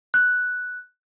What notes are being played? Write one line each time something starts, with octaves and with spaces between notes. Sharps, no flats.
F#6